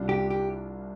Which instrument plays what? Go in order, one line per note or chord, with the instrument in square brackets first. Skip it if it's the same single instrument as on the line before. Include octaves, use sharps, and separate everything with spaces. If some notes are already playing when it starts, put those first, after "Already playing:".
Already playing: [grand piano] C2 C3 G3 D4 F4
[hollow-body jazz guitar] G4
G4